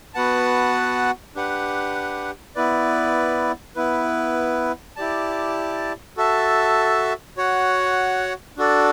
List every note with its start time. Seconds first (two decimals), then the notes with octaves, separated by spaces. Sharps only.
0.14 B3 F#4 B4 F#5 A5
1.35 D4 G4 B4 F#5
2.55 B3 E4 B4 D5
3.76 B3 E4 B4
4.96 E4 G4 D5 A5
6.17 F#4 A4 E5 A5
7.37 F#4 C#5 F#5
8.57 D4 F#4 A4 D5